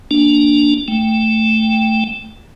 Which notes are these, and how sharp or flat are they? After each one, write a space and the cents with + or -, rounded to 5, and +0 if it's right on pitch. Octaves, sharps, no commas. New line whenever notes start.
A#3 +5 D4 +0
A3 +0 G5 +0